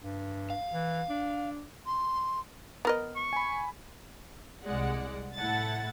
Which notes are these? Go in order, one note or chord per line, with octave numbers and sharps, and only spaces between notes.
G2
F5
E3
D4
C6
B3 A#4 D#5
C#6
G#5 B5
C2 G#3 D5 F#5
A2 E4 A4 F#5 A6